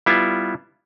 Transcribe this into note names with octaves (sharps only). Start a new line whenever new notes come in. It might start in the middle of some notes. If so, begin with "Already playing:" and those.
G3 B3 E4 F4